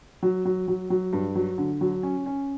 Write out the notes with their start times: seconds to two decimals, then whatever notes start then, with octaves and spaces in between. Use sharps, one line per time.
0.23 F#3
0.45 F#3
0.68 F#3
0.90 F#3
1.13 G2
1.35 F#3
1.58 D3
1.81 F#3
2.03 C#4
2.26 C#4